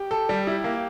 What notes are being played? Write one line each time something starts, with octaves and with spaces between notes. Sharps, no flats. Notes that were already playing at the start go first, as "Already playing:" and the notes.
Already playing: G4
A4
G3
E4
A#3